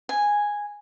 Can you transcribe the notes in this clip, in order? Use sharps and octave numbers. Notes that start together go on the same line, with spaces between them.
G#5